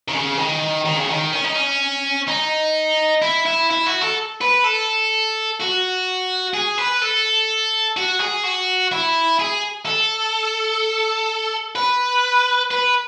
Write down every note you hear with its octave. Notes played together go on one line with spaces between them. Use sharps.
D#3
C#3
D#3
D#3
C#3
D#3
C#4
D#4
C#4
D#4
E4
E4
E4
F#4
A4
B4
A4
F#4
G#4
B4
A4
F#4
G#4
F#4
E4
G#4
A4
B4
B4